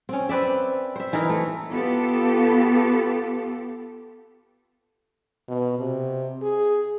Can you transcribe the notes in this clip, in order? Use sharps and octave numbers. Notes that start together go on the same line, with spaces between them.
C4 C#4
C4 B4 D5 E5
C5 E5
E3 D#4 E4 A#4
A3
B3 F4 G4 A4
B2
C3
G#4